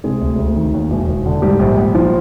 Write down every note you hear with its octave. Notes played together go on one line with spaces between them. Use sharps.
C3 G#3 G#4
D2
D2
D#3
D#2
E1
E1
D3
G#2 G3 G4
A#1
A#1
F3